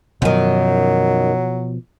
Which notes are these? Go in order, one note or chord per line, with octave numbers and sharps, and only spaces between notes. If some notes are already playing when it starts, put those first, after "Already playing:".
F#2 B2 D#3 F3 F#3